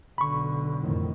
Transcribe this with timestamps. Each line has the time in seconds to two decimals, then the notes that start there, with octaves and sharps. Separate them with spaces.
0.18 B1 D3 B5 C#6
0.80 F2 A2 D#3